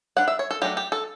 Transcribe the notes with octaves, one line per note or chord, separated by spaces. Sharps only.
G3 D4 F#5
E5
C#5
A4
F#3 A3 D4 G4
G4
A4